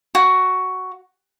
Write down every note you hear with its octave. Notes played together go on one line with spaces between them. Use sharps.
F#4